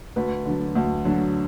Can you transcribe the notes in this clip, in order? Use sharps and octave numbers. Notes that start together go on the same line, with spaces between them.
D2 B4
D3 F#3
D2
D3 F#3